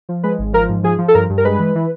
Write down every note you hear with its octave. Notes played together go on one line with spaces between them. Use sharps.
F3
G#3 B4
G#1
F3 A#4
G#2
F3 G#4
F3
A4
G2 A#4
G2
A#4
G#3 B4
E3
E3